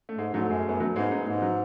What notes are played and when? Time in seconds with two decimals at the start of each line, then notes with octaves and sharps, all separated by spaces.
0.09 A3
0.18 G#2 G#3
0.33 G#2 F#3 A3
0.49 F#2 G#3
0.65 F#2 B3
0.80 F#3 A3
0.95 G#2 G#3 B3
1.11 B3 D#4
1.27 G#2 G#3
1.42 F#3